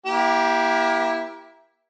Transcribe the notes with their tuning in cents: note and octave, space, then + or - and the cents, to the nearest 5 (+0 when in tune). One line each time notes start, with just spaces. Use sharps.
A#3 +35 E4 +0 G4 +0